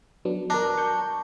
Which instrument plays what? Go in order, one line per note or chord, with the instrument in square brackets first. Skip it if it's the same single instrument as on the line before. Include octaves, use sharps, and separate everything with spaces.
[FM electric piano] F#3 B3 D4
[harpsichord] D4 [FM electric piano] A#4 A#5
[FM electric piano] C#6 G6